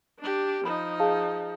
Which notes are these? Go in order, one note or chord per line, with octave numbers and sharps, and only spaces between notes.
D4 G4
F3 D#4 B5
G#4 F5 A5